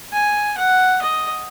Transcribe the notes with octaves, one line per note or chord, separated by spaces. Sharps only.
G#5
F#5
D#5